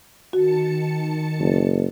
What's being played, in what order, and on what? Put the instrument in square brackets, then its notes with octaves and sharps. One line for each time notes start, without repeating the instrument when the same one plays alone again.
[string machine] D#3 A5 C#7 [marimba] F#4
[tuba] F#1